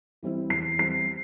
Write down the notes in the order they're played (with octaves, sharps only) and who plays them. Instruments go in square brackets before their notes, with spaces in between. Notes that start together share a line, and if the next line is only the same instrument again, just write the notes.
[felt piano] E3 G3 C4 E4
[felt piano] E2 [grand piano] C7
[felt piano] E3 G3 C4 E4 [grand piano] C7